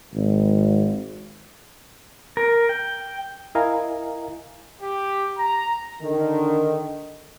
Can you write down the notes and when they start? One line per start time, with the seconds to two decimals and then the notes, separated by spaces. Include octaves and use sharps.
0.14 G#1
2.37 A#4
2.69 G5
3.55 E4 A#4 D#5 F5 G#5 A#5
4.82 G4
5.38 A#5
6.02 D3 D#3